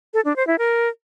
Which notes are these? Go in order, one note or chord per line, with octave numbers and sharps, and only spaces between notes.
A4
D4
C5
E4
A#4